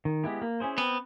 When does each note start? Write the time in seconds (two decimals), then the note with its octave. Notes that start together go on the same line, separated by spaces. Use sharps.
0.05 D#3
0.24 G#3 B3 E4 G4
0.42 A#3
0.60 C#4 E4 G#4 C5
0.78 B3 C4